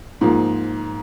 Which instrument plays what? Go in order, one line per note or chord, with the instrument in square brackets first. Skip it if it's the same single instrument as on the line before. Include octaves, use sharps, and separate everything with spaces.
[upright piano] G#2 F3 A#3